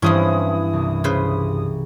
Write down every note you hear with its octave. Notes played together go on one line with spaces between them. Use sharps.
G2 E3 F3 C4 C#4 E4 D#6
C2
C#3 B4 C5